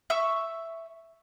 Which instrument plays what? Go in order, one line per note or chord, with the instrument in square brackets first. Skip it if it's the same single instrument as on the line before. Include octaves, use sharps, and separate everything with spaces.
[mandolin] E5 C#6 E6